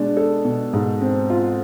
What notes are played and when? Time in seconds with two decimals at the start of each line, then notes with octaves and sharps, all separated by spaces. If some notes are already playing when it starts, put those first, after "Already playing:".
Already playing: B2 G#3 D4
0.17 A4
0.45 B2
0.73 G#2
1.01 C4
1.30 F4